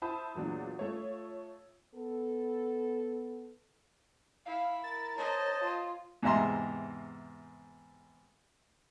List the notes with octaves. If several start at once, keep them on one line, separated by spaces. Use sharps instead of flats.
E4 C5 A5 B5 D#6
E2 A#2 F#3 D4
A3 F4 C#5
B3 A4
E4 F5
A#4 A6
C5 C#5 D#5 A5
F4
E2 G#2 C3 E5 A#5 C6